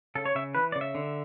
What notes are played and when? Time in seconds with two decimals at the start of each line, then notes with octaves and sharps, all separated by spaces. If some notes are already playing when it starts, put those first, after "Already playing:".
0.15 C#3 A4
0.26 C#5
0.35 C#3 E5
0.55 E3 B4
0.72 C#3 D5
0.81 E5
0.95 D3